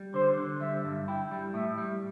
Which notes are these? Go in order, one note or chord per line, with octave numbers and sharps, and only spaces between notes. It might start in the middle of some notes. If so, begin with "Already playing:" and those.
Already playing: G3
D3 C5
D3
G3 E5
G2
E4 G5
G3
A2 E5
G3